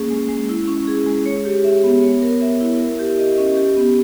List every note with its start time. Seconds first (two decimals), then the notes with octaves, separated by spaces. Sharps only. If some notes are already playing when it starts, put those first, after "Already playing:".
Already playing: A#3 C#4 G#4
0.10 G#3
0.29 G#3
0.49 E4
0.68 C#4
0.87 G#4
1.07 G#3
1.26 C#5
1.45 G4
1.64 E5
1.84 B3
2.02 C#5
2.22 A#4
2.41 E5
2.60 E4
2.80 A#4
2.99 G4
3.18 D#5
3.38 C#4
3.57 G4
3.76 B3